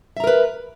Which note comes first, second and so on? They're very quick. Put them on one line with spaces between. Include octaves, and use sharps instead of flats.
E5 A#5 A#4 B4